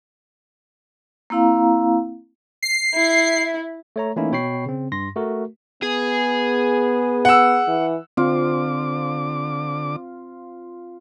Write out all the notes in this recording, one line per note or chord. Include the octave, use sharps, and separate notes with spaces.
A#3 C4 E4 F5 A#5
C7
E4
A3 C#5 A#5
E3 A3 A#3 C#4 D#4 E4
B2 C#5 G5 B5 C#6 C7
C#3 C4
G2 C6 A#6
A3 F#4 A#4
B3 G#4
F#5 E6
E3
D3 C4 F4 D6